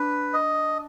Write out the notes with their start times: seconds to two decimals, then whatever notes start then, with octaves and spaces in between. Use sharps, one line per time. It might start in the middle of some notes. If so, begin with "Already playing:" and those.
Already playing: D4 B4
0.33 D#5